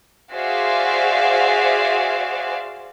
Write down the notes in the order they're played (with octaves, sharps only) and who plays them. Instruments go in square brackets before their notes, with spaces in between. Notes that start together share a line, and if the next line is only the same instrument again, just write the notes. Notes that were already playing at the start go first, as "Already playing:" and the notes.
[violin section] F#4 G#4 C5 D5 E5 F5